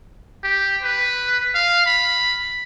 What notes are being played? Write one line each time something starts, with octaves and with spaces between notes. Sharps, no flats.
G4
B4
F5
B5